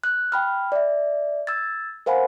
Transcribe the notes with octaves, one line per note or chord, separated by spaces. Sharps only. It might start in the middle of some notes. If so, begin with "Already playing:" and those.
F#6
G5 B5 F6
D5 E5
E6 G#6 A6
A#4 C5 F5 F#5 G#5 B5